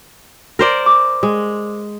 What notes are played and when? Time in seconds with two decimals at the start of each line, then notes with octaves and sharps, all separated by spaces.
0.59 A#4 C5 D5
0.86 D6
1.23 G#3